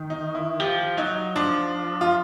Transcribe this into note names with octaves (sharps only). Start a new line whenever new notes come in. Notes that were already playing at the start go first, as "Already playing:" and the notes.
Already playing: D#3
D#4
E4
F3 G4
F#3 D#4
F3 D4
F4